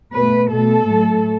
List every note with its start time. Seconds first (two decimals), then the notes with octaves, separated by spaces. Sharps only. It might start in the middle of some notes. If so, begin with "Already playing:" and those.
0.15 B2 A3 B4
0.50 B2 A3 A4
0.86 A2 F#3 A3